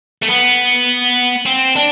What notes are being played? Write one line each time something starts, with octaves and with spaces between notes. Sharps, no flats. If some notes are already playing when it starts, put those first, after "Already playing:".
A3
B3
C4
D4